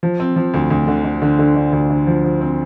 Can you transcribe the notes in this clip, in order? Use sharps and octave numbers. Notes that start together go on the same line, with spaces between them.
F3
C4
F3
D2
D2
D3
D3
D3
D3
D3
D2
D3
F3
F3
C4